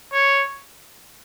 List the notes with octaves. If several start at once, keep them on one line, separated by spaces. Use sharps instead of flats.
C#5